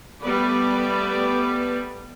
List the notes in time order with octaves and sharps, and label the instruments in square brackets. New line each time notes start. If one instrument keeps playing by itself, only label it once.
[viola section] G3 A3 B3 B4 D5